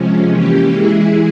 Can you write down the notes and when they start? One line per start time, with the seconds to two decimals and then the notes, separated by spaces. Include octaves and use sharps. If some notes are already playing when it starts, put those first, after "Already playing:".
Already playing: C3 F3 G#3 C#4
0.31 E3 A#3 C#4 G4
0.71 E3 G#3 E4 G#4